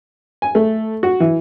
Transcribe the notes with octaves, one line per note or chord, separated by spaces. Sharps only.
G#5
A3
F#4
E3